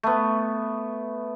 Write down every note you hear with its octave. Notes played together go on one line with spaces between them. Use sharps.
A3 B3